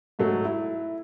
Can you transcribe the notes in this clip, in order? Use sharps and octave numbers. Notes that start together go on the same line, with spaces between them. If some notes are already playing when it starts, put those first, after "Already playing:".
G#2 F#3 A3
E4